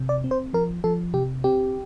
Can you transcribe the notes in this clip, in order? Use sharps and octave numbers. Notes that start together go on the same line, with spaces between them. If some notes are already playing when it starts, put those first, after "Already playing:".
Already playing: C3
D5
C4
C5
F3 A#4
F3 A4
C3 G4
C4 G4